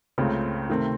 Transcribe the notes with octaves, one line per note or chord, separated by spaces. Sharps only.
C#2 C#3 A3 C4
C3 D#3 A3 C4